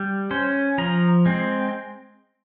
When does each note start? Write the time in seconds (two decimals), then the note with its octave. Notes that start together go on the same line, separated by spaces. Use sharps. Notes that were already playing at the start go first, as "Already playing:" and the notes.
Already playing: G3
0.31 C#4 C5
0.78 F3 A#5
1.26 G#3 C4